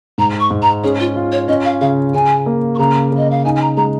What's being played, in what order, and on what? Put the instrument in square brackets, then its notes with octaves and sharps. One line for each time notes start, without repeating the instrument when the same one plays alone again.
[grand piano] G#2 [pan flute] A#5
[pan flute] C#6
[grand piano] G#2
[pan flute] A#5
[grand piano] C#4 [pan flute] G#4
[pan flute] F4
[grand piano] F4
[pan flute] C#5
[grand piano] C#4 [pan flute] D#5
[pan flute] F5
[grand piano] C#3 [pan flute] F5
[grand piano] C#3 [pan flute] G#5
[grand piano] A#3
[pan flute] C#6
[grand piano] C#3 [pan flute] A#5
[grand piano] C#3
[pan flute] D#5
F5
[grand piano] D#4 [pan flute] G#5
[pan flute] G#5
A#5
[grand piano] G#3 [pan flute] A#5